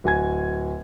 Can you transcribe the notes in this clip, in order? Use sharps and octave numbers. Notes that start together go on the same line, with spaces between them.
D1 F#4 G#5 G#6